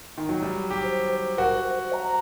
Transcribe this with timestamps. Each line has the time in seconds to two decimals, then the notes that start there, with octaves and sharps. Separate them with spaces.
0.18 D#3
0.29 F#3
0.42 G3
0.70 G4
0.84 C5
1.11 C5
1.38 F#4 A#4
1.56 C5
1.74 C5
1.93 A#5